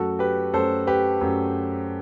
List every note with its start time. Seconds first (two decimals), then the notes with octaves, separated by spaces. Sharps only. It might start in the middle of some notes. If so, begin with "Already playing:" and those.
Already playing: F#2 F#3 A3 F#4 A4
0.19 G4 B4
0.53 F#2 F#3 A3 A4 C5
0.87 G4 B4
1.21 F#2 F#3 A3